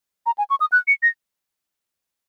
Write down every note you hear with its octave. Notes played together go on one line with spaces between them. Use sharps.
A#5
G#5
C#6
D#6
F#6
C#7
A#6